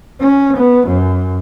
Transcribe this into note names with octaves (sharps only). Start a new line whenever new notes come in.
C#4
B3
F#2